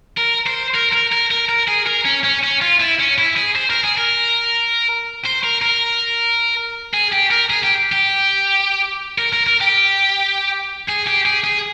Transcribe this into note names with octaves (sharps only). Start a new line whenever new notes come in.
A#4
C5
A#4
A#4
A#4
A#4
A#4
G#4
A#4
C#4
C#4
C#4
F4
E4
C#4
E4
G#4
C5
A#4
G#4
A#4
C5
A#4
A#4
G#4
G4
A#4
G#4
G4
G4
A#4
A#4
A#4
G4
G#4
G4
G#4
G#4